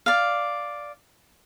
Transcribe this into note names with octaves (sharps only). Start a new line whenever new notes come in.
D5 F5